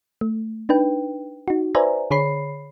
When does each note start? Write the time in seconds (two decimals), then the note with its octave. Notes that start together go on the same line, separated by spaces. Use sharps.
0.21 A3
0.69 D4 D#4 B4 G5
1.48 D#4 F#4
1.75 B4 C5 D5 E5 G#5 A#5
2.11 D3 G#4 C#5 B5 C7